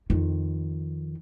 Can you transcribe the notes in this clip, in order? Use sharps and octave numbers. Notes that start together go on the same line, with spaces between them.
F2 D#3